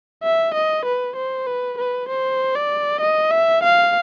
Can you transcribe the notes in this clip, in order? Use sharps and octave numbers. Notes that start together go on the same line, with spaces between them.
E5
D#5
B4
C5
B4
B4
C5
D5
D#5
E5
F5